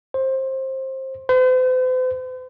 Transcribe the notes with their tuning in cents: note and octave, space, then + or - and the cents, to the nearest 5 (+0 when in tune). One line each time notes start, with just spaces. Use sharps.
C5 +20
C5 -45